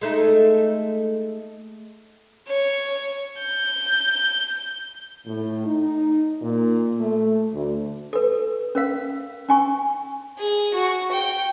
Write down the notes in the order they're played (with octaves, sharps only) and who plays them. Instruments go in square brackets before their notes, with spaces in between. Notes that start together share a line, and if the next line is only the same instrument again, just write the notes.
[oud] G#3 A3 D#4
[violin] C#5
G6
[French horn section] A2
D#4
A#2
A3
D2
[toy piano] A4 B4
C#4 A#4 F5
C#4 G#5 C#6
[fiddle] G#4
F#4
G5